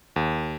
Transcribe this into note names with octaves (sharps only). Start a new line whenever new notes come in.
D#2